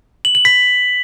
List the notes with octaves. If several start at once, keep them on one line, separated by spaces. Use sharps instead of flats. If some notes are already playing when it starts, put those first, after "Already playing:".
F#7
F#7
B6